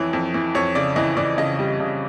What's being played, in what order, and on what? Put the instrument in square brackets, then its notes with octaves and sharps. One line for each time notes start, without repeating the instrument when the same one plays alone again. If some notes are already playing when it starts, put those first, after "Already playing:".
Already playing: [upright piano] F2 E3 C#5
F2
E3
F2 C#5
C#3 D5
E3 D#5
E3 D5
C#3 D#5
G3
C#3